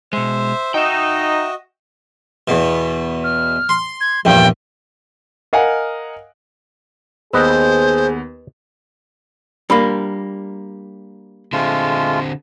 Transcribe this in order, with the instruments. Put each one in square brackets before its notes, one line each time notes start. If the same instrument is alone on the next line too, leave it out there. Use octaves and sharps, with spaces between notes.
[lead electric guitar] B2 G#3 [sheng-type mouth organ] C5 E5
[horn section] D#4 [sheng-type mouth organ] F#4 D#5 [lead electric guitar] E5 G5
[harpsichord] E2 B2
[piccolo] F6
[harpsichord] C6
[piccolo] G#6
[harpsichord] A#1 E2 G2 [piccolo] G5
[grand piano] A#4 D#5 F5 F#5 G#5
[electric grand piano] D#2 B3 E6 [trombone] G#4 [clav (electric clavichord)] B4 D#5 [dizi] C5
[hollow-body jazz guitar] G3 A#3 [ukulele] D4 F4 B5
[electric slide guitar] D3 C4 [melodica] G#3 A3 F4